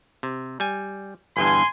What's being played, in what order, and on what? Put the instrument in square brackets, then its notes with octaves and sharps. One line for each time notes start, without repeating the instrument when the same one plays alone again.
[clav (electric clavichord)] C3
G3 G#5
[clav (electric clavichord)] G1 E2 G2 [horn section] G#5 C6